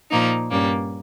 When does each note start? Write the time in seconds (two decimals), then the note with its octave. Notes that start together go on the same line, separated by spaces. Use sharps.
0.10 A#2 F3 A#3 D#4
0.50 G2 G3 A#3 C#4